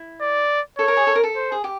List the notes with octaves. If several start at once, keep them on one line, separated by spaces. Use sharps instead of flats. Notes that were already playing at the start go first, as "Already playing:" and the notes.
Already playing: E4
D5
A4 C#5
A#4
G#4
A4
A#4
A4
C5
G#4
G4